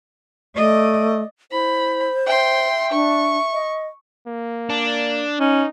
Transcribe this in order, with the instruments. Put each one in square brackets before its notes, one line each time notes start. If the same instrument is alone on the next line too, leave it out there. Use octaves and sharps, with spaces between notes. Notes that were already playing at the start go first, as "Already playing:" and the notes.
[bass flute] A3 [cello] D5 D#5
[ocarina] E4 [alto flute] C5 [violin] B5
[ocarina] E5 [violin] G5 C6
[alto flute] D4 [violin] C#6
[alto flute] D#5
[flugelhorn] A#3
[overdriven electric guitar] D4
[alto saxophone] C#4 [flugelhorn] D#4